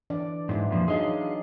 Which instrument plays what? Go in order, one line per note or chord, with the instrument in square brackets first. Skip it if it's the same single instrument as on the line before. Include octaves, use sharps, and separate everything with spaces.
[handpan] E3 D4 D5
[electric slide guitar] G#2 [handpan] F#3 E4
[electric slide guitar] F2 A#2 F3
[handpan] F#3 D4 D#4 [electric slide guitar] G#4 D#5 F5